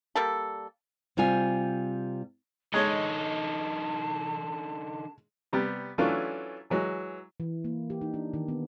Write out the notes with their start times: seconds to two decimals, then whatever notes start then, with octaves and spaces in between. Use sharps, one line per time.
0.15 G3 A#3 A4
1.17 C3 G3 F4 G#5
2.74 D3 G#3 D#4 C#5 A5
5.53 C3 G3 B3
5.98 E3 F#3 A3 C#4 D4 F4
6.70 E3 F#3 G#3
7.40 E3
7.64 A#3
7.90 G4
8.01 D#4
8.14 D4
8.34 D#3
8.48 B3